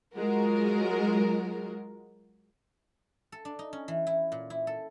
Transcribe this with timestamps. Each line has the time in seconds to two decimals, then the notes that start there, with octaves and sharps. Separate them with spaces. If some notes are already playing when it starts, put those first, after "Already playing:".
0.15 F#3 G#3 F4 F#4 A#4
3.32 A4
3.45 D4
3.59 D#4
3.73 C#4
3.88 E3
4.07 E4
4.32 A#2
4.50 E4
4.67 A4